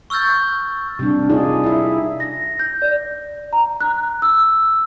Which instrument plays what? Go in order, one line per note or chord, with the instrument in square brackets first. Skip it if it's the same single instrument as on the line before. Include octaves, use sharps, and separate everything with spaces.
[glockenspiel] C#6 E6 F6 G6 A6
[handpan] C3 G3 D4
D#4 F4 G#4 D5
E4 E5
[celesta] A#6
G6
D5
A#5
F#6
E6